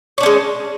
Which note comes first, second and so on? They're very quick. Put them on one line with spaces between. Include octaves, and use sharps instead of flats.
C#5 D4 C#4 G#3